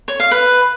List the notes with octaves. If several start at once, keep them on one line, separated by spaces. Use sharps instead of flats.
C#5
F5
B4